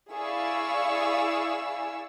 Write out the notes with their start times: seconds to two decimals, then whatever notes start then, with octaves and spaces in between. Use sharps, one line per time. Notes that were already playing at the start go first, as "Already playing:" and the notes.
0.11 E4 G#4 D5 F5 C#6 E6